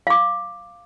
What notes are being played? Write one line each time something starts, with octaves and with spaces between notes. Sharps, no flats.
F5 D6